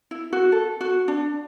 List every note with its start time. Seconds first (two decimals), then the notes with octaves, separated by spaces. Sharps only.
0.11 E4
0.33 F#4
0.52 A4
0.81 F#4
1.08 D4